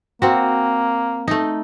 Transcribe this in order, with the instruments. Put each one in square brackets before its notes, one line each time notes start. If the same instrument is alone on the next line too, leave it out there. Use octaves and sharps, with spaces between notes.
[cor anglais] A#3 [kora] C4 F#4
[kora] A3 D#4